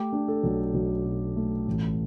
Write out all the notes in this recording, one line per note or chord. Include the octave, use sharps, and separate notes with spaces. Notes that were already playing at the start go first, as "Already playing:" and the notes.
Already playing: A3 G4
D4
A4
B1
B1
B2
A3
A1